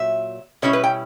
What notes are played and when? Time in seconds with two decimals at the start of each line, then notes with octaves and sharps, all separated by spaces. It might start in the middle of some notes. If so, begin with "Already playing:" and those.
Already playing: A#2 F#3 E5
0.62 B2 G3 C#4 E4 C#5
0.73 B4
0.84 G5